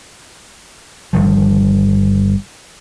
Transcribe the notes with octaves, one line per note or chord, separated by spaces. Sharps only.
G1 G2 D#3 F3